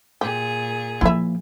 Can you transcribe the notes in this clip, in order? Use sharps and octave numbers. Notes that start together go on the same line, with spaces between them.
A#2 G4 G#4
F3 A#3 E4 E5